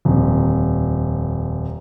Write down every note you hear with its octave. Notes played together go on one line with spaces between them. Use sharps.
D#1 F2